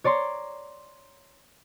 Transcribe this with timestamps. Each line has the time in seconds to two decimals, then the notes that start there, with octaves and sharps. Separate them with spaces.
0.04 C#5 D5 A#5 C6